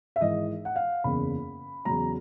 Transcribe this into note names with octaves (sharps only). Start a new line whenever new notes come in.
E5
G#1 G#2 E3 D#5
F#5
F5
F#1 E2 C#3 B5
E2 C#3 F#3 A#5